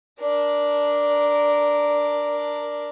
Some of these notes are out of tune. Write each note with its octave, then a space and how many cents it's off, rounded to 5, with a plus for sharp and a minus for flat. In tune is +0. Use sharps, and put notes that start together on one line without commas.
D4 +0 A#4 +0